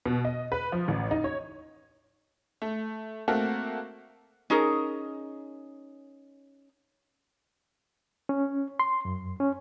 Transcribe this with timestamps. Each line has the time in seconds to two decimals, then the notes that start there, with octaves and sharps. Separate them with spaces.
0.06 B2
0.25 D#5
0.52 B4
0.72 F3
0.88 A1
1.11 D#4
1.24 C#5
2.62 A3
3.28 A3 A#3 C4 F#4 A4 A#4
4.50 C#4 D#4 G#4 A#4
8.29 C#4
8.80 C6
9.05 F#2
9.40 C#4